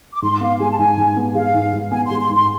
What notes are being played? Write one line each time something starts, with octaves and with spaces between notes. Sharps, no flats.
D6
G#2 C6
B3 F5
G#3 G#5
A5
G#2 G#5
G#2
B3
G#3 F5
G#2
G#2
B3 G#5
G#3 C6
C6
G#2
C6